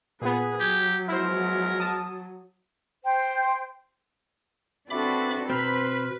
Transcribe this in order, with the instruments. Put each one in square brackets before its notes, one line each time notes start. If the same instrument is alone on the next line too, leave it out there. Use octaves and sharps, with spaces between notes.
[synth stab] A#2 B3 [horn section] G#4 [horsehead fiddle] B4
[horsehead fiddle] F#3 [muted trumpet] G4 [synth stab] G#6
[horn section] F3 G#3 B3 [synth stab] E4 C5 [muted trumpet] A#4
[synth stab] A5 D#6
[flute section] C5 G5
[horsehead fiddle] C4 F#4 [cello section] D4 A4 B4 [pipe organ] E5 B5 D6
[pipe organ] B2 F6 [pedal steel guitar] C4 C5 A#5 [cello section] B4 [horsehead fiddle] B5